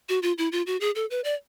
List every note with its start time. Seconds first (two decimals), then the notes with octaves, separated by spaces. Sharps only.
0.09 F#4
0.22 F4
0.38 E4
0.52 F4
0.67 F#4
0.81 G#4
0.95 A4
1.11 B4
1.24 D5